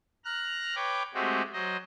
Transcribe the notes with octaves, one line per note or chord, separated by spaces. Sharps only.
A#5 F6 F#6
B4 C#5 G5 D6
G#3 A3 C4 F#4 G4
F#3 C5 D#5